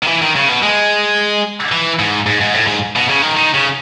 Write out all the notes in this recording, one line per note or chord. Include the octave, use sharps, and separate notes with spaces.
D#3
E3
D#3
C#3
B2
G#3
E3
G#2
G#2
G#2
A2
G#2
B2
C#3
D#3
D#3
C#3